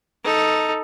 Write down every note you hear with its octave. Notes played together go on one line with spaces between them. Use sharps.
D#4 A4